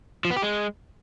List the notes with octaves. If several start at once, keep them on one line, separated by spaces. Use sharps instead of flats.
F3
B3
G4
G#3